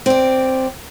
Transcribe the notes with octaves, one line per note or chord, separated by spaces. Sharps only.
C4 D5